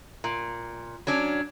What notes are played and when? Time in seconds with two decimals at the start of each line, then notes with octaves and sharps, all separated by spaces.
0.24 A#2
1.07 F#3 C#4 D4